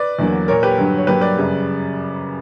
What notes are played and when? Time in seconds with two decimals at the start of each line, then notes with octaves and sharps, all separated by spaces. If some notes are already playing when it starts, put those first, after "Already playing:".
Already playing: B4 D5
0.19 E2 D3 F#3 A#3
0.48 A#2 A#3 A#4 C#5
0.63 G4 B4
0.78 G2 D3 F#3
0.98 C#5
1.07 G2 F#3 A#3 G4 B4
1.21 B4 D5
1.37 F#2 C#3 G3